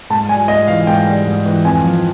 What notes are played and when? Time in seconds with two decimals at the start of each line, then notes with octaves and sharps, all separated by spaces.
0.10 G#2 A5
0.29 G3 G#5
0.48 G#2 D#5
0.68 E3 F5
0.87 G#2 G5
1.07 G3
1.26 G#2
1.46 E3
1.65 F2 G#5
1.84 F3